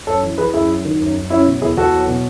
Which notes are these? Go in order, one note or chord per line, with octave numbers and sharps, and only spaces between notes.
F#2 A4 C#5
E3
E3 G#4 B4
F#2 E4 G#4
F#3
D#3
F#2
F#2
F#3 C#4 E4
B2
E2 E4 G#4
E2 F#4 A4
F#3
B2